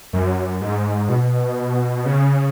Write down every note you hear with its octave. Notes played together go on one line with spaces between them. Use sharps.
F#2
G#2
B2
C#3